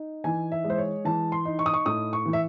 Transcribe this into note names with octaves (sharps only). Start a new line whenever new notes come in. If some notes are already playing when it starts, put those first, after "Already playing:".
Already playing: D#4
E3 G#5
E5
G#3
C5
C#5
E3 A5
C6
D#4
C#6
D#6
C#6
A2 D#6
C#6
E3
E5